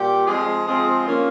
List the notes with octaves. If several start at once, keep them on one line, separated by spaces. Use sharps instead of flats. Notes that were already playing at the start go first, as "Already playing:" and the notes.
Already playing: A#2 G3 G4
F3 G#3 C4 F4 G#4
F3 G#3 C4 F4 G#4
D#3 A#3 C#4 F4